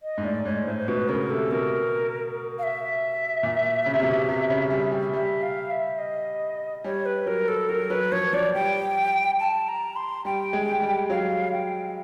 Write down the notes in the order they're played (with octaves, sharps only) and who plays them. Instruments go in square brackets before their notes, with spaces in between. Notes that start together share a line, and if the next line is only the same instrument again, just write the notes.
[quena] D#5
[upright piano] G#2
[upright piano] A2 [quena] D5
[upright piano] G#2 [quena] C#5
[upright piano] A2 [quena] C5
[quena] C5
[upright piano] B2 [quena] B4
[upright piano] C#3 [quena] A#4
[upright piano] C3 [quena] A4
[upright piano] B2 [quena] A#4
[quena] F5
E5
[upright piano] A#2
C#3
C3
B2
C3
C3
C#3
G3
G3
[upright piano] G3 [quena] E5
[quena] F5
E5
D#5
[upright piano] G3 [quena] C#5
[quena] B4
[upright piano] F#3 [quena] A#4
[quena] A4
[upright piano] F#3 [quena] A#4
[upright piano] F#3 [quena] B4
[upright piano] F3 [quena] C#5
[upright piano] F3 [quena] D5
[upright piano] G3 [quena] G5
[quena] A5
A#5
C6
[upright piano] G3 [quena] G5
[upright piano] G#3
G3
[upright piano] F#3 [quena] F5
[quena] G5